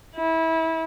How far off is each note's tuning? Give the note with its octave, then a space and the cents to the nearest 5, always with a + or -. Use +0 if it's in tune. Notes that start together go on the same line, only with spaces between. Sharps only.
E4 -25